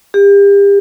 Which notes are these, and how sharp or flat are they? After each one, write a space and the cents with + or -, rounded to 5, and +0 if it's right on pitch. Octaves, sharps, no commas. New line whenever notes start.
G4 +35